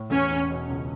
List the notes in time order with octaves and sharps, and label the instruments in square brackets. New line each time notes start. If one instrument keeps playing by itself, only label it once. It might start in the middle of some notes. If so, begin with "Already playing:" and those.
Already playing: [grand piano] A2
[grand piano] E2 [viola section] C#4
[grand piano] E1
B2
C#2